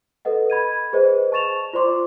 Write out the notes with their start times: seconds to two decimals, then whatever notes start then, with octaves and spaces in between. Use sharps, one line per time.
0.25 A4 B4 D#5 F#5
0.50 B5 G#6 D#7
0.93 G#4 B4 C5 D5 D#5
1.32 A5 C#6 A6 E7 F7
1.73 F4 C5 D5 C6 D6